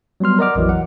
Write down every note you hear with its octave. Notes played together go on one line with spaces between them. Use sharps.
F#3 G3 B3 C6 F6
A#4 D5 D#5 F#5 D6 F6
A#1 F2 E3 F#3
F#5